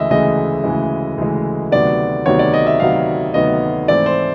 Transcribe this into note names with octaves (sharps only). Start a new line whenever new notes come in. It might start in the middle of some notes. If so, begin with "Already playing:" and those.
Already playing: D2 C#3 E3 G#3 D#5 E5
D2 C#3 E3 G#3 D#5
D2 C#3 E3 G#3
D2 C#3 E3 G#3
D2 C3 D#3 F#3 B3 D5
D2 C3 D#3 F#3 B3 C#5
D5
D#5
E5
D2 C3 D#3 F#3 B3 F5
D2 C3 D#3 F#3 B3 D#5
G#2 E3 A3 C4 E4 D5
C5